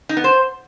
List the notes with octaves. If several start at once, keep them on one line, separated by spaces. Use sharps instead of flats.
D#4
B3
C5